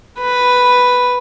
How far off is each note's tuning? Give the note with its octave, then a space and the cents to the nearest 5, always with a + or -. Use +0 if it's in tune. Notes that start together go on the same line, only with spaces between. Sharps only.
B4 +0